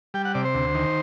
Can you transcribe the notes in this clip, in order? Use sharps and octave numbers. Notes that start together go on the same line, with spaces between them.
G3 G5
F#5
C3 D5
C5
D2
D#3